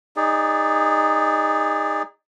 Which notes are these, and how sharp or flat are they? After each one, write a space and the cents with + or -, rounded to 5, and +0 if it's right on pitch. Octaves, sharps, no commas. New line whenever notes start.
D#4 +0 G#4 -30 D5 +0